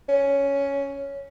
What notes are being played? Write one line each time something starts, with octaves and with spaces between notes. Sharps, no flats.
C#4